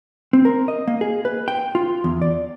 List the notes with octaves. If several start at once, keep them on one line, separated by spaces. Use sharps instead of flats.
C4
A#4
D#5
A#3
G#4
B4
G5
F4
E2
D5